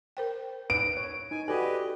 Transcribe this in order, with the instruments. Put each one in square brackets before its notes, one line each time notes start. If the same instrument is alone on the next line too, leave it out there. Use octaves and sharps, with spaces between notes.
[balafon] A#4 C5 G5
[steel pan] B4 [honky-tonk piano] D7
[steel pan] C#5
[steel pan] D#4 [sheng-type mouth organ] G#5
[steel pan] F#4 D5 G#5 [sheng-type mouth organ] G4 B4 D#5 [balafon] A4